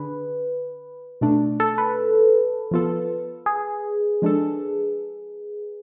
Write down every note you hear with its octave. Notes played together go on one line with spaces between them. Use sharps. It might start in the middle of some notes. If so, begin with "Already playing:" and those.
Already playing: D3 D4 G#4 B4
B2 A3 D4
A4
B4
F3 B3 F4 A4
G#4
F3 G#3 D4 A4